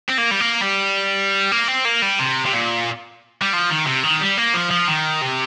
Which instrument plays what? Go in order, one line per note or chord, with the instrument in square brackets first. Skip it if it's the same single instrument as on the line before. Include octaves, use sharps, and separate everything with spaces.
[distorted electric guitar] C4
A#3
G3
A#3
G3
A#3
C4
A#3
G3
C3
C3
A#2
G3
F3
D#3
C3
D#3
G3
A#3
F3
F3
D#3
C3